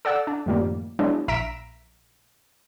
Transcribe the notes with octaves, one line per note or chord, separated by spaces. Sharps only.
A4 D5 F#5 E6
D4
F#2 A2 D#3 F3 G3 A#3
F#3 G#3 B3 D4 E4
A#1 E5 A#5 B6 D7 E7